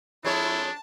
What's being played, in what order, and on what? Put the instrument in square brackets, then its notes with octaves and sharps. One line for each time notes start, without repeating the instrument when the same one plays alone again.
[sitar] F2 G#3 C#5 [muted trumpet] D4 [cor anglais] E4 [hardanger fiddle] A5